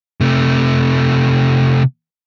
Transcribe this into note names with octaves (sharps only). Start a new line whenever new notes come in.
C3 A3